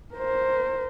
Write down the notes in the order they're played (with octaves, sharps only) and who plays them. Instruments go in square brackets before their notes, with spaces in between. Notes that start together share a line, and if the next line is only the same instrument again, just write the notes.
[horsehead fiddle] A#4 C5